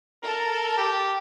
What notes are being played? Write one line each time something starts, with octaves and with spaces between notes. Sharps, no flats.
A4 A#4
G4